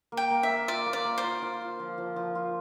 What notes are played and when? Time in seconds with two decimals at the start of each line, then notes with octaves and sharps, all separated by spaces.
0.12 A#3
0.17 G5
0.30 A#3
0.43 E5
0.49 A#3
0.68 F4 D5
0.86 A#3
0.93 D5
1.05 A#3
1.18 C5
1.24 F4
1.42 F4
1.61 F4
1.79 F3
1.98 F3
2.16 F3
2.35 F4